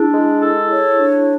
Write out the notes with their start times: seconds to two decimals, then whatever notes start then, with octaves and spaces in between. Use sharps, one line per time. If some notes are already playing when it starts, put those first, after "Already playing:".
Already playing: D4 E4 G#4
0.13 G#3
0.41 A4
0.70 C#5
0.97 D4